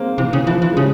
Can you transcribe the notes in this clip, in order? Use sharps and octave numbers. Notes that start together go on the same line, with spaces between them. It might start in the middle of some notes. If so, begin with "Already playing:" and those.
Already playing: G#3 A#3 C4
C3 E3
C#3
E3 F3
E3
G#3
C#3 G3